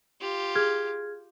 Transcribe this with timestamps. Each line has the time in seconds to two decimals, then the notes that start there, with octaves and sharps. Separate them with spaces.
0.20 F4 G4
0.55 G#4 F6 G#6